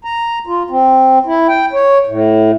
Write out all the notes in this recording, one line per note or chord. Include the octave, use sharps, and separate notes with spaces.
A#5
F4
C4
E4
G5
C#5
A2